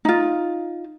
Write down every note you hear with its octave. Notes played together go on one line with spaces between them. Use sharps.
D#4 F4